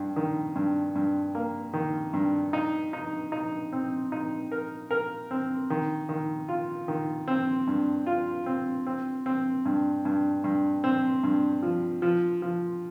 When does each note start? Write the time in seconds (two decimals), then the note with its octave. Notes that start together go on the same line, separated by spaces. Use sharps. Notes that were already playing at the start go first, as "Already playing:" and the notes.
Already playing: G2
0.16 D#3
0.56 G2
0.96 G2
1.35 A#3
1.73 D#3
2.14 G2
2.53 D#4
2.93 D#4
3.32 D#4
3.72 C4
4.12 D#4
4.52 A#4
4.91 A#4
5.31 C4
5.70 D#3
6.09 D#3
6.48 F4
6.88 D#3
7.28 C4
7.68 G2
8.06 F4
8.46 C4
8.86 C4
9.26 C4
9.65 G2
10.05 G2
10.44 G2
10.84 C4
11.23 G2
11.62 F3
12.02 F3
12.42 F3